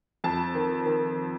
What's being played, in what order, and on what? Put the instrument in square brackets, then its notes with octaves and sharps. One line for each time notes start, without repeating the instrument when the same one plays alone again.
[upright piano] F2 A5
D#3
D#3